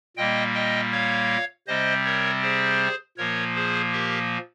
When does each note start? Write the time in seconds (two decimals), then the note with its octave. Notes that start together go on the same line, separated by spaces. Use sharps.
0.17 A#2 G3 A#3 D#5 G5
0.54 D#5 G5
0.92 C#5 F5
1.68 C3 G3 C4 C5 D#5
2.05 A#4 C#5
2.42 G#4 C5
3.18 A#2 F3 A#3 A#4 C#5
3.55 G#4 C5
3.93 G4 A#4